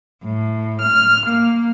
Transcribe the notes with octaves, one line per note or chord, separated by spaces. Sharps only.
A2
F6
A#3